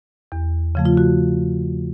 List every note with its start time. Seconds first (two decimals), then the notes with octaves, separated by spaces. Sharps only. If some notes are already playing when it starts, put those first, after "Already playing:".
0.32 E2
0.75 C#3 F3 A3
0.85 F4
0.97 F#4